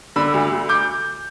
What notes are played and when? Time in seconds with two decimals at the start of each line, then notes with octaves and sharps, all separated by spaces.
0.16 D3 B5 E6
0.34 D2
0.52 D2
0.69 D6 G6